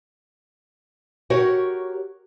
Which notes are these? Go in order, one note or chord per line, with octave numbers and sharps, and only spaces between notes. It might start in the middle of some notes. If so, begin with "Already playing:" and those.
F#4 G4 A#4 C#5